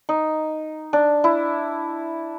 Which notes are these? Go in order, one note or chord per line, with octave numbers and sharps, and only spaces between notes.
D#4
D4
E4